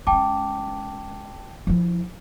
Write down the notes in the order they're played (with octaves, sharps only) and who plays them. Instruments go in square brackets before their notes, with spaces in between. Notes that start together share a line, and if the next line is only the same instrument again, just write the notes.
[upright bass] G#3 C#4 [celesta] G5 A5 D6
[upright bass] F3 E4